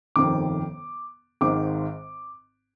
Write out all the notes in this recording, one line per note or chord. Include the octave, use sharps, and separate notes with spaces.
G1 F2 C3 D#3 D6
G#1 G#2 D#3 D6